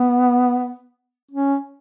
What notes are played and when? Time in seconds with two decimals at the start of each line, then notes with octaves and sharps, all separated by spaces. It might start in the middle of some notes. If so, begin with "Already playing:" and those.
Already playing: B3
1.31 C#4